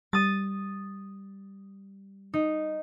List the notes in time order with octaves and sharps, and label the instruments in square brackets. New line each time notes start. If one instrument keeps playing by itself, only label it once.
[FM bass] G3 [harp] D#6 A6
[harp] D#4